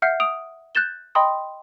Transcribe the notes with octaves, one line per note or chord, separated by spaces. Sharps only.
E5 F#5 F6 G6 C7
D#6 D7 F7
F#6 G6 A6 E7 G7
D#5 G5 B5 C6 D#6